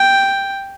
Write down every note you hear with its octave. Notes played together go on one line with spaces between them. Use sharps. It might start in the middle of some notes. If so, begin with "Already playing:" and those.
Already playing: G5